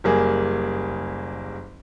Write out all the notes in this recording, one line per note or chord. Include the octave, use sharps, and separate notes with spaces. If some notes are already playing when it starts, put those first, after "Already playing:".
F#1 G3 A#3 G#4